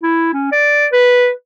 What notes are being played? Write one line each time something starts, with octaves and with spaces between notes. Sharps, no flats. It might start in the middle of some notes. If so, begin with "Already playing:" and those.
E4
C#4
D5
B4